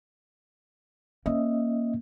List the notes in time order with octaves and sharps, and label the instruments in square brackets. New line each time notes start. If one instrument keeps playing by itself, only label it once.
[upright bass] A#3 [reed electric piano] C#4 D#5 E5